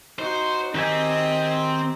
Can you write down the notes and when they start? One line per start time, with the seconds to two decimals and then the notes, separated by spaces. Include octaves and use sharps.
0.19 D#4 F#4 C5
0.75 D#3 C4 G4 D#5 G#5